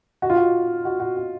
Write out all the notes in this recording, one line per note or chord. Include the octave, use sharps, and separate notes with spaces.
F#4
F4
F#4
F#4
F#4
F#4